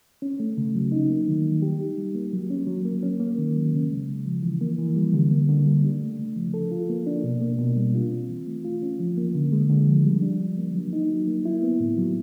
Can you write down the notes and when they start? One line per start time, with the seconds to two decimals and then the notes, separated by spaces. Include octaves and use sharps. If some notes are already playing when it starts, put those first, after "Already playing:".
0.22 C#4
0.40 A3
0.57 C#3
0.75 F#3
0.92 D#4
1.10 A#3
1.27 D#3
1.45 G3
1.62 G4
1.80 D#4
1.98 G3
2.15 A#3
2.33 F#3
2.50 C#4
2.67 F#3
2.85 A#3
3.03 C#4
3.20 A#3
3.38 D#3
3.56 F#3
3.73 C#3
3.90 G#3
4.08 C#3
4.26 F3
4.43 E3
4.61 A#3
4.78 E3
4.96 G3
5.13 D3
5.31 A#3
5.49 D3
5.66 G3
5.84 D4
6.01 A3
6.19 C#3
6.36 F3
6.54 A4
6.71 F4
6.89 A#3
7.06 D4
7.24 B2
7.41 A#3
7.59 B2
7.76 G3
7.94 F4
8.12 C4
8.29 E3
8.47 A3
8.64 F4
8.82 C#4
8.99 F3
9.17 A#3
9.35 D3
9.52 G#3
9.70 D3
9.87 F3
10.05 G3
10.22 D4
10.40 G3
10.57 A#3
10.75 F#3
10.93 D#4
11.10 F#3
11.27 A#3
11.45 E4
11.63 B3
11.80 A2
11.98 F#3